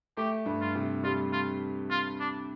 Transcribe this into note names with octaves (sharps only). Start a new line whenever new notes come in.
A3 G4
G2
F4
C3
G3 F4
F4
F4
D4